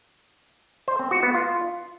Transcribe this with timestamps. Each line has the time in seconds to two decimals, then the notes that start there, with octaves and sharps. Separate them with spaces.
0.88 C5
0.99 C4
1.11 F#4
1.23 B3
1.34 F4